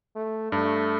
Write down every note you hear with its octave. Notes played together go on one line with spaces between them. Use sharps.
A3
G2 A3